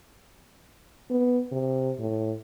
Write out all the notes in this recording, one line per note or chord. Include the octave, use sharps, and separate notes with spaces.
B3
C3
A2